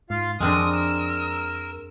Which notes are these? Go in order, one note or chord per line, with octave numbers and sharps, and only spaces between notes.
G#2 F4 F5
F2 G#3 C4 D4 A#4 D#6
E6